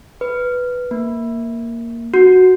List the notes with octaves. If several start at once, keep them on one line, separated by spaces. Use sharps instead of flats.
B4
A#3
F#4